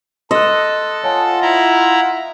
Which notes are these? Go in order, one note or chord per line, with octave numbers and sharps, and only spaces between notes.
A4 D#5 C6 F#6
F4 C#5 F#5 G#5 A5
E4 E5 A#5